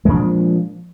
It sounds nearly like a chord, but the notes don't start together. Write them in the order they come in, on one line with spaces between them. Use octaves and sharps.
G#3 A#2 D4 F3